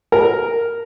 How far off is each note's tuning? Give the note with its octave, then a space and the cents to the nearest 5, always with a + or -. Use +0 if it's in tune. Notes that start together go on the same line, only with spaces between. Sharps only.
A#4 +0